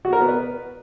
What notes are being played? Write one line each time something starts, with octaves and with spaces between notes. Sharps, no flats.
F#4
A#4
B3
B4